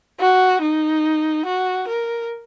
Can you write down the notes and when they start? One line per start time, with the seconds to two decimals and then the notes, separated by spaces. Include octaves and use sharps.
0.20 F#4
0.62 D#4
1.45 F#4
1.87 A#4